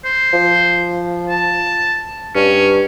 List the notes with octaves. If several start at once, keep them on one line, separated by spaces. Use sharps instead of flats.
C5
F3
A5
G2 C#4